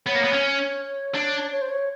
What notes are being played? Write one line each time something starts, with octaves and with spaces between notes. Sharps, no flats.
B3 C#5
A#3
B3
C#4
D4
C#5
C5
C#5